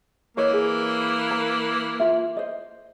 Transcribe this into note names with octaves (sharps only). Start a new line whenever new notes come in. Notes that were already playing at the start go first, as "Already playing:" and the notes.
E3 A#3 C#5 D#5
G#4
A#5
F4 E5
C5 D#5